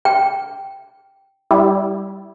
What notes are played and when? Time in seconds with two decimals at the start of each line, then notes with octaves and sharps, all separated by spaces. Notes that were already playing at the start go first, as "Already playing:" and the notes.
0.05 G5
1.51 G3 E4